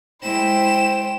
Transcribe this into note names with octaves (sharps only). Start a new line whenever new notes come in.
G#3 E4 C5 G5 E7